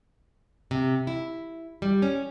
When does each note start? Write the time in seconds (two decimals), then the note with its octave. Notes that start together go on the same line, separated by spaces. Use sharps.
0.71 C3
1.07 E4
1.82 G3
2.02 C#4